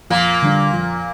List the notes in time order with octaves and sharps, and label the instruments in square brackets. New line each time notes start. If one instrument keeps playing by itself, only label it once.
[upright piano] F2 [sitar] A#2 A#3
[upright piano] D3 G3 D4
F2